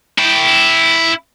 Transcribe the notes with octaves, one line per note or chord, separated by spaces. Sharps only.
E4 G5